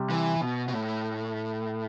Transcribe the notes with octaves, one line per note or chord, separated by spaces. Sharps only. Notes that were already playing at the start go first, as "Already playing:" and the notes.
Already playing: C3 G3
E3
B2
B2
A2